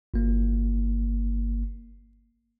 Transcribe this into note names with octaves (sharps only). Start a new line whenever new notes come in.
G1 A#3